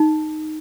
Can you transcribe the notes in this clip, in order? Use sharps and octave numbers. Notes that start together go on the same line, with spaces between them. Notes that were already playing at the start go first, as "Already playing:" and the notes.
Already playing: D#4